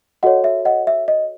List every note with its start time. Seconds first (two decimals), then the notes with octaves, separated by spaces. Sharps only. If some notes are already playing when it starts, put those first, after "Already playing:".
0.23 F#4 A4 C#5 D#5 F#5
0.44 E5
0.65 D#5 F#5
0.87 E5
1.08 D#5